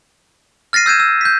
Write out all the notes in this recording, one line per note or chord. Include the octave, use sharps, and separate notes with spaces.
F6 A6 A#6 C7 D#7
E6 G6 G#6 D#7 E7
E6
G6 B6